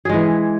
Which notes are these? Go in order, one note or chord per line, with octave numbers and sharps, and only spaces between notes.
E3 G#3 G#4